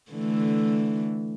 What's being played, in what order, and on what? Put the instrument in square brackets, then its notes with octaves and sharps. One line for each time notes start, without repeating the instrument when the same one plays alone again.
[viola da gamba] D3 E3 A3